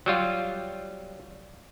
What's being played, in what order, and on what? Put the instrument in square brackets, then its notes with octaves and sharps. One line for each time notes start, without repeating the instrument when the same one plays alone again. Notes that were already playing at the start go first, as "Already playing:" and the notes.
[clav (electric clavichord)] F#3 G3 F4